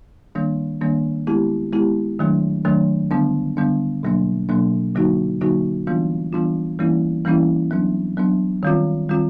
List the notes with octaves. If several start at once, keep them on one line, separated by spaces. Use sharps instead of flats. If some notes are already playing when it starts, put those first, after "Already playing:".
D#3 G3 A#3 D4
D#3 G3 A#3 D4
G#3 B3 E4 G4
G#3 B3 E4 G4
D#3 F#3 A3 D4
D#3 F#3 A3 D4
D3 G3 B3 D4
D3 G3 B3 D4
B2 F#3 A#3 D4
B2 F#3 A#3 D4
D3 F#3 A#3 D#4 F#4
D3 F#3 A#3 D#4 F#4
E3 G3 B3 D4 F4
E3 G3 B3 D4 F4
E3 G3 A#3 C#4 E4
E3 G3 A#3 C#4 E4
F#3 B3 D4
F#3 B3 D4
D#3 G3 C4 F4
D#3 G3 C4 F4